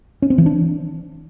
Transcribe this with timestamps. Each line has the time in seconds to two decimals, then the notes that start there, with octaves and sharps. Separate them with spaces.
0.22 C#4
0.30 C4
0.38 E3
0.46 D4